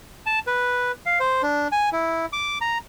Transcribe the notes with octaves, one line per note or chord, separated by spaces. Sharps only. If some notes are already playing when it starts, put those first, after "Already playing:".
A5
B4
F5
C5
D4
G#5
E4
D6
A#5